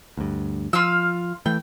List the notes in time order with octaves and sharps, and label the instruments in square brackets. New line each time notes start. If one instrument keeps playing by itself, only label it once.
[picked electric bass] D2 G2
[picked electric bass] F3 [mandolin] F4 F5 E6
[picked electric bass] E3 A3 [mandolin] G5